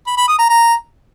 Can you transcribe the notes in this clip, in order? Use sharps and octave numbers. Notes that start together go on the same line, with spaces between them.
B5
B5
D#6
A#5
A#5